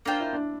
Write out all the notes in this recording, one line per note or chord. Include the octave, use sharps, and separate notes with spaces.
A#3 D4 F4 C5 G5
E4
D4